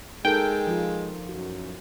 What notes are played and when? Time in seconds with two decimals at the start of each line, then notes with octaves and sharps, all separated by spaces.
0.25 G#3 D#4 A4 A#4 G5
0.67 F3 F4
1.29 F#2 F#4